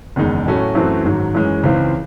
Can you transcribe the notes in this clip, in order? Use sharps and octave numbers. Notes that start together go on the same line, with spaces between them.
F#1 E2 D#3 G#3 D#4
A2 F#3 A3 C#4 F#4
F#2 E3 A3 C4 F#4
G#2 D#3 F#3
F#2 E3 G#3 C#4
C#2 C#3 E3 C4 D#4